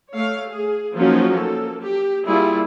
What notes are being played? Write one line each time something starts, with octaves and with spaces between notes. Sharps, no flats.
A3 C#5 F5
G#4
F3 F#3 A#3 C#4 D#4 F4
A#3 A4
G4
G3 A#3 E4 F4 G#4